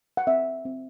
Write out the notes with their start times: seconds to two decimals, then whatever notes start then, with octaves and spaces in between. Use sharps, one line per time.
0.17 F#5
0.27 C4 E5
0.65 C4